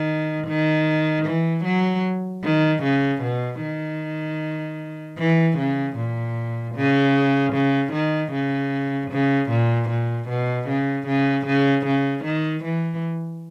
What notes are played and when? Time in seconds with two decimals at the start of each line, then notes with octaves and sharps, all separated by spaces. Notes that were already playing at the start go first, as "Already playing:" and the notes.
Already playing: D#3
0.48 D#3
1.26 E3
1.65 F#3
2.43 D#3
2.83 C#3
3.22 B2
3.62 D#3
5.18 E3
5.58 C#3
5.97 A#2
6.76 C#3
7.53 C#3
7.93 D#3
8.33 C#3
9.11 C#3
9.50 A#2
9.89 A#2
10.29 B2
10.68 C#3
11.07 C#3
11.46 C#3
11.86 C#3
12.25 D#3
12.64 E3